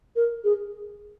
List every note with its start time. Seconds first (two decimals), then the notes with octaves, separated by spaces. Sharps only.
0.16 A#4
0.44 G#4